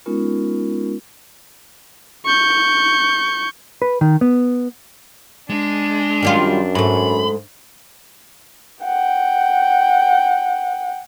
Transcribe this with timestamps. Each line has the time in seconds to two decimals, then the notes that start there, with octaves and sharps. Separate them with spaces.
0.06 G#3 B3 C#4 D#4 F4 A#4
2.26 C#6 G6
3.82 B4
4.01 D#3
4.21 B3
5.50 G#3 D4
6.22 F#2 D#3 G3 F4
6.75 G#2 A3 B5
8.84 F#5 G5